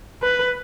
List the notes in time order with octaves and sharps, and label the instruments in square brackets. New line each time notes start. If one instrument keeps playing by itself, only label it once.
[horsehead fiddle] B4